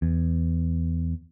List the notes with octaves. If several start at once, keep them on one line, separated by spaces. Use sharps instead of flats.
E2